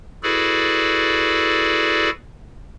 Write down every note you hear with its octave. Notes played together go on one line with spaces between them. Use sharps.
E4 F#4 G#4 A4 B4 D5